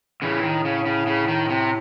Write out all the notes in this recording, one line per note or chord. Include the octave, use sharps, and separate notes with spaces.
A2 C#3 E3
D#3
C#3
C#3
C#3
D#3
C3